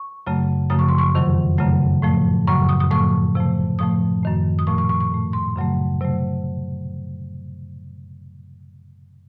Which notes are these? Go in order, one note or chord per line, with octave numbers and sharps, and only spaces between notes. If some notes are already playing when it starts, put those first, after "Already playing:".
Already playing: C#6
F#2 C#3 F#3 A3
F#2 C#3 F3 A3 D#6
C#6
C6
C#6
F2 C3 D#3 F#3
F#2 C#3 F#3 A3
A2 F3 A3
F#2 C#3 F#3 C#6
D#6
D#6
A2 F3 A3 C#6
C3 F3 A3
A2 F3 A3 D#6
F#2 D#3 A3
D#6
A#2 F3 A3 C#6
C#6
C#6
C#6
A2 A3
C6
F#2 C#3 F#3 A3
C3 F#3 A3